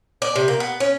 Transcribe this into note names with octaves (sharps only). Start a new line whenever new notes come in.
D5
C3
A#3
B3
C#4